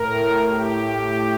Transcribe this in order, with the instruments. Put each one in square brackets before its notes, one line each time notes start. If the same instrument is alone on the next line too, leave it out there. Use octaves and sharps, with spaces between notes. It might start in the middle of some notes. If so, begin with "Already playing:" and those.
Already playing: [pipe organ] A2 A#4
G4